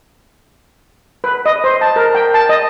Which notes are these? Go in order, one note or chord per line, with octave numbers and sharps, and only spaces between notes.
B4
D#5
C5
A5
A#4
G5
A5
D#5